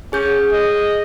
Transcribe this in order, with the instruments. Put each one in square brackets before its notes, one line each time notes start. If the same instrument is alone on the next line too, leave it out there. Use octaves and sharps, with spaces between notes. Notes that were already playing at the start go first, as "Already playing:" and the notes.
[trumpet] C#4 [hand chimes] G#4 G6
[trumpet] D#5